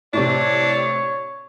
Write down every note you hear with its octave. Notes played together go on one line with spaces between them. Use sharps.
A2 C3 D4 C#5